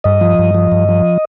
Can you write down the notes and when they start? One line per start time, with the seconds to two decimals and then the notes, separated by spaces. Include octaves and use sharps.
0.04 G2 D#5
0.21 F3
0.39 G2
0.54 F3
0.72 G2
0.89 F3